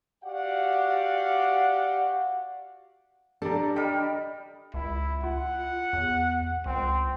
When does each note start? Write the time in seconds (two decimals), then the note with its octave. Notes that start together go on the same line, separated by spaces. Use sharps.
0.24 F#4 G4 D5 F5 F#5
3.42 D4 G4 A4 D5 A#5
3.76 G3 A#4 D#5 G5
4.74 C#2 E4
5.24 F4 F#5
5.93 E2
6.66 C#2 C4